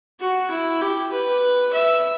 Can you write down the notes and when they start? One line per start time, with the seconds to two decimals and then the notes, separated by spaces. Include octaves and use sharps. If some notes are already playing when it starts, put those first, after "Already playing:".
0.20 F#4
0.51 E4
0.81 G4
1.12 B4
1.73 E5